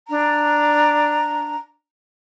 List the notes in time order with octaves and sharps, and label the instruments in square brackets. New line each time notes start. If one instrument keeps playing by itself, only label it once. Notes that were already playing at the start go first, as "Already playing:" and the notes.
[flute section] D4 A#5